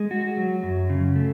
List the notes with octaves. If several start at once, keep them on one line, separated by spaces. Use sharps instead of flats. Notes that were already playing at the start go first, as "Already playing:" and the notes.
Already playing: G#3
F#4
F#3
F#2
C#3
A3